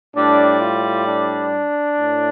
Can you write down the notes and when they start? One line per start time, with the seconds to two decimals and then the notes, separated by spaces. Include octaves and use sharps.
0.15 A2 G3 D4
0.61 F4
1.08 D4
2.00 A2